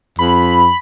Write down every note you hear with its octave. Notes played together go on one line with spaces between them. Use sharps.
F2 B5